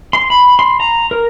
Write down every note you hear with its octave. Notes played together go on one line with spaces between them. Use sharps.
C6
B5
C6
A#5
A#4